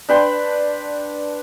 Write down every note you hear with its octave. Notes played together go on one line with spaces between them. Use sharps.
D4 B4 G5 C6